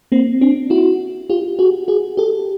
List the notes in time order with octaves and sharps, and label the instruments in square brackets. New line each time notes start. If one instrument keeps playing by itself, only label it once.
[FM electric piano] A#3 C4
C4 D4
E4 F#4
F4 G4
F#4 G#4
F#4 G#4
G4 A4